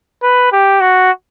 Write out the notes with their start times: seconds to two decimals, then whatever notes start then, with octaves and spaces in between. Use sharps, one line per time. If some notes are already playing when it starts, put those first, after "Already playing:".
0.23 B4
0.52 G4
0.81 F#4